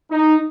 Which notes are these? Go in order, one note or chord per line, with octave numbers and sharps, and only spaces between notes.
D#4